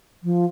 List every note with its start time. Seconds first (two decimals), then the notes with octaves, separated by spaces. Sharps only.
0.23 F3